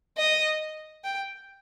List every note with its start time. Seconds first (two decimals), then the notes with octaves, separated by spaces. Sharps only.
0.18 D#5
1.04 G5